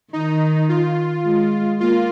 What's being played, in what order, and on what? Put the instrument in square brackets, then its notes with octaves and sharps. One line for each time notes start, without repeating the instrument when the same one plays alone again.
[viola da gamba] D#3 [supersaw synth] D#4
[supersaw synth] F4
[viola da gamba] G#3
[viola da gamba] A#3 [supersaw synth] F4